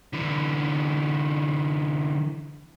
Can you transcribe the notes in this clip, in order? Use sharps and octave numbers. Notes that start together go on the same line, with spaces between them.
D3 E3